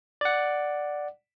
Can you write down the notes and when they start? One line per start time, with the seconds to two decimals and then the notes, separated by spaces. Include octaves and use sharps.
0.21 D5 F#5